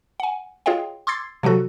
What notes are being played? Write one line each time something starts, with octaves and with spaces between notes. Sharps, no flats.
F#5 G#5
F4 G#4 C#5 D#5 F5 G5
C6 D6 E6 G#6 A6 C7
C3 F3 F#3 F#4 A4